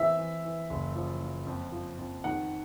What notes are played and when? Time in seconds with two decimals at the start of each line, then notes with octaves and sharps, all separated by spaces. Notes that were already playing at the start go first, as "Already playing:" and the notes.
Already playing: E3 C4 E5
0.18 E3
0.45 E3
0.70 F#1
0.96 F3
1.21 F3
1.47 F2
1.72 F3
1.99 F2
2.24 D#3 F#5